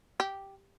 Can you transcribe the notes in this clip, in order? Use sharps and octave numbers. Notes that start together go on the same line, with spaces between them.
G4